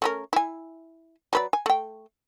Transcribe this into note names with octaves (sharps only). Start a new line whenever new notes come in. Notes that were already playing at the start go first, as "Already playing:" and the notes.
A3 C#4 A#4
E4 G#5
F#3 B4 D5
G#5
A3 G5